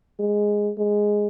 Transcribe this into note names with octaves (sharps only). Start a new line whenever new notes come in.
G#3
G#3